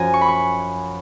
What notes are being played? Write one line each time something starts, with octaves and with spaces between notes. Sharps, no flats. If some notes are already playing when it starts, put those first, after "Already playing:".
Already playing: F#2 F3 G#5 A#5
C#6
B5
C#6